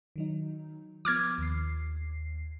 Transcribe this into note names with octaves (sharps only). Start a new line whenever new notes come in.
D#3 F#3 D#4
F3 B3 D6 F6 G#6
D#2 C7